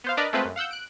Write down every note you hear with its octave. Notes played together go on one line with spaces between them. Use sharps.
B3 C5 F5
D4 A#4 B4 D5 D#5
G#3 A3 C4 F4 B4 C5
F#2
F5 F#5 E6 G6
F#6 D7